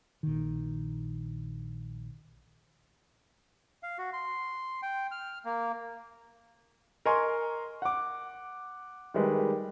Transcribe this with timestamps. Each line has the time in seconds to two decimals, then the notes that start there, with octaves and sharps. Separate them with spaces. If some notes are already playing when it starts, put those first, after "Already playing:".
0.23 A#1 D#3
3.83 F5
3.98 F#4
4.13 C6
4.83 G5
5.11 F6
5.45 A#3
7.05 A#4 D#5 G#5 A#5 C6 C#6
7.82 F#5 D6
9.14 D#3 G3 G#3 B4